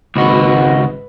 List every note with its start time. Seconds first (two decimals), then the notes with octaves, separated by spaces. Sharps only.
0.16 G#1 C#2 F#4 B4 D#5